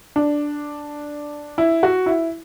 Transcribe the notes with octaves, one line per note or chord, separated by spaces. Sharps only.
D4
E4
F#4
E4